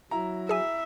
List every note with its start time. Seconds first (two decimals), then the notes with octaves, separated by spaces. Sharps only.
0.11 F#3 E4 A#5
0.49 G#4 E5 G#5